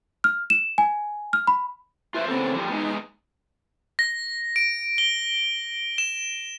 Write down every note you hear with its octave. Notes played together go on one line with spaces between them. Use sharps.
F6
E7
G#5
F6
B5
F4 B4 C5 E5
C#3 B3 C4 A4
D3 F3 G3
G#3 B3 D#4
A#6
D7
G7
E7